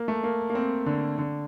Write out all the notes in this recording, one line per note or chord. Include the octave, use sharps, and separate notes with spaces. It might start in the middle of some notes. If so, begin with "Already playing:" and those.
Already playing: A#3
A3
A#3
A#3
C4
D3
D3